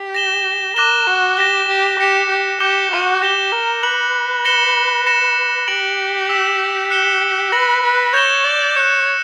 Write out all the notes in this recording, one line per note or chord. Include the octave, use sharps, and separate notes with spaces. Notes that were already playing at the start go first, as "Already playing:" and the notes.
Already playing: G4
A#6 E7 G7
A#4 D6 F#6 A#6 E7 G7
F#4
G4 A#6 E7 G7
G4
G4 A#6 C#7 E7
G4
G4 D6 G6 C#7 E7 G7
F#4
G4 A#6 E7 G7
A#4
B4 F#6 C#7 F#7
A#6 C#7 E7 G7
A#6 C#7 E7
G4 F#6 A#6 D7 F#7
E6 B6 E7
F#6 C#7 E7 G7
B4 A#6 C#7 F#7
B4
C#5 G6 A#6 E7 G7
D5
C#5 F#6 C#7 E7